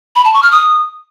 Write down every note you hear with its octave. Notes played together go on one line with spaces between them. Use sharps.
B5
A5
C#6
F6
D#6